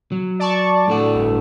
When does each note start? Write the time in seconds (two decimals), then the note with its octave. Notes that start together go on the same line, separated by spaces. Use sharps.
0.12 F#3
0.40 D5 A5 C#6
0.88 A2 D4 F#4 A4
1.14 G1